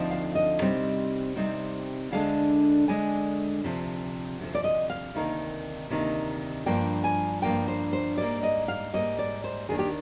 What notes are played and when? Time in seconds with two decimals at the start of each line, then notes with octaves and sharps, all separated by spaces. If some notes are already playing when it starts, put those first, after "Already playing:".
Already playing: D2 D3 F3 C4 D#4
0.11 F5
0.35 D#5
0.61 C3 G3 C4 D#4
1.36 C3 G3 C4 D#4
2.12 D2 D3 G#3 D4 F5
2.88 D2 D3 G#3 D4 G#5
3.63 D2 C3 F3
4.40 D2 C3 F3
4.55 D5
4.64 D#5
4.90 F5
5.14 D2 C3 D#3 A#3 D#4
5.90 D2 C3 D#3 A#3 D#4
6.66 G2 F3 A#3 D4 G5
7.04 G#5
7.42 G2 F3 A#3 D4 G5
7.68 C5
7.93 C5
8.18 G#2 G3 A#3 D5
8.43 D#5
8.68 F5
8.93 G#2 G3 A#3 D#5
9.19 D5
9.44 C5
9.69 D#2 D#3 A#3 D4 G#4
9.79 G4